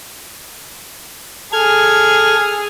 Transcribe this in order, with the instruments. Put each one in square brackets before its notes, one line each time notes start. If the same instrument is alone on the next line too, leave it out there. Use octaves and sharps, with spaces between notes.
[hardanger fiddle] G#4 [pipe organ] A4 F6 G#6